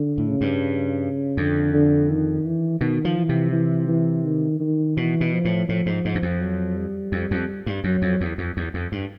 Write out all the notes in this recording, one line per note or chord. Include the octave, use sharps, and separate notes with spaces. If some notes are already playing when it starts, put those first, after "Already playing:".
Already playing: D3
A2
C#3
G2
F2 D3
D3
D#3
E3
B2 D#3
F3
E3
C3
E3
E3
D#3
D#3
B2 E3
B2
F3
A2
A2 F3
G#2
G#2
F#2
F2
F#3
G3
F2
F2
G2
F#2 F#3
F2
E2
F2
E2
F2
G2